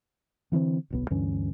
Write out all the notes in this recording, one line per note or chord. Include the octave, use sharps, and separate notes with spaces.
D3 E3 B3 C4
D1 B1 B3
D2 G2 E3 C#4